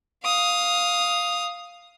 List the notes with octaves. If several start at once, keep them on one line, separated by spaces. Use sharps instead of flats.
F5 D#6